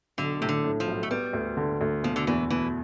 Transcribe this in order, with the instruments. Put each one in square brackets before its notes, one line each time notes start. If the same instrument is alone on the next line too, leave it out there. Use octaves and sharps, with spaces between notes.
[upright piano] B1 [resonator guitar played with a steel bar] D3
[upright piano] A2 [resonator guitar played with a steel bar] C3
[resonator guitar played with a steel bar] D3
[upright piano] A2
[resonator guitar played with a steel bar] F3
[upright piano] B1
[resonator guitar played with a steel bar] A3
[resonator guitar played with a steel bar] G3 [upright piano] B3
[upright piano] D2
D3
D2
[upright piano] B2 [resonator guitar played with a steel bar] F3
[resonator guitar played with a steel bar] D3
[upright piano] E2 [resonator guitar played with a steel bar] E3
[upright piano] B2 [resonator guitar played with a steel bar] E3